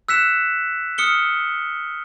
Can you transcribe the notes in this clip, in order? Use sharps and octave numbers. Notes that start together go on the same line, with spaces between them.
E6 F#6 B6 C#7 E7
D#6 F6 C#7 G7